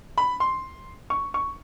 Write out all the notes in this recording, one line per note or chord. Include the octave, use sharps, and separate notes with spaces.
B5
C6
C#6
C#6